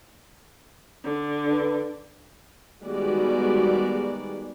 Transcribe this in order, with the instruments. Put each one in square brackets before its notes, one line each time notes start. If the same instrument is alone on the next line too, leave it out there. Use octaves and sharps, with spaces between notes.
[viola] D3
[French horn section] D4 B4
[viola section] D#3 G3 G#3 B3 F#4 D5